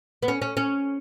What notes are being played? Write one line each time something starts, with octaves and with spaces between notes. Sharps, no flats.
B3
C#4
C#4
C#4